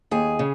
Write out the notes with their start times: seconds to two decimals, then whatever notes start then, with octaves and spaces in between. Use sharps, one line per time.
0.11 D#2 G#4
0.39 C#3